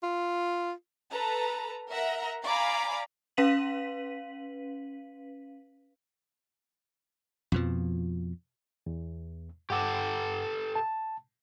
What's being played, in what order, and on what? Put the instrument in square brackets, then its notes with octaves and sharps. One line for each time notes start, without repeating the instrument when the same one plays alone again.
[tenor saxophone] F4
[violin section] A4 B4 A#5
A#4 E5 F#5 A#5 A#6
D5 F5 G#5 A#5 B5 D6
[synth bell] C#4 B4 F5 B6 D#7 F#7
[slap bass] F2 B2 F3
[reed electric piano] E2
[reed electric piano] G2 F#5 D6 [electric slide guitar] G4 A4
[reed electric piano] A5